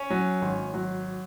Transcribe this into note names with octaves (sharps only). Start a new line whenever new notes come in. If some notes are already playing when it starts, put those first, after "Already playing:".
Already playing: C#4
F#3
G#1
F#3